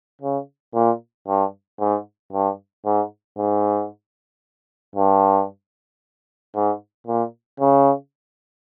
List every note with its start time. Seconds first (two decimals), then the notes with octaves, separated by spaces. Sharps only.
0.22 C#3
0.74 A#2
1.28 G2
1.79 G#2
2.33 G2
2.85 G#2
3.38 G#2
4.96 G2
6.55 G#2
7.07 A#2
7.60 C#3